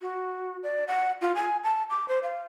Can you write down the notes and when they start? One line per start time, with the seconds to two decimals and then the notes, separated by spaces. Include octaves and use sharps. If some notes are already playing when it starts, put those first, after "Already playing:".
0.02 F#4
0.63 D5
0.88 F#5
1.21 F4
1.35 G#5
1.64 A5
1.90 D6
2.08 C5
2.23 F5